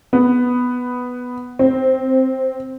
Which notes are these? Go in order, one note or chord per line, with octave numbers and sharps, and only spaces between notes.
B3
C4